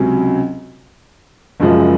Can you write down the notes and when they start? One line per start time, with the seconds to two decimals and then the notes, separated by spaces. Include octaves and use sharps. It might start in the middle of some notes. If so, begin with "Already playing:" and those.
Already playing: C#2 C3 F#3 C#4
1.60 F#1 F#2 F3 G#3